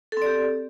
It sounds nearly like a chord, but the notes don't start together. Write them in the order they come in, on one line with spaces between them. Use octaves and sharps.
A4 C4 D5 G4